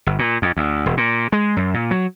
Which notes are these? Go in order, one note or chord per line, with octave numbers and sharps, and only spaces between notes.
G1
A#2
F2
D2
E1
A#2
G#3
F#2
A#2
F#3